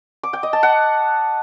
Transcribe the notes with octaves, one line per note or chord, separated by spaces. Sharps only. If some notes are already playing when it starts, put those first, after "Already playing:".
D6
G5
D#5
A5
F#5